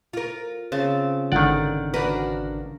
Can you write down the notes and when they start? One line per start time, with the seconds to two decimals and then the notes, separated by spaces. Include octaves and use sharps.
0.13 F4 A#4
0.72 C#3 C4 A5
1.32 G#1 D3 D#3 D5 F#5
1.94 D4 F#4 A#4 B4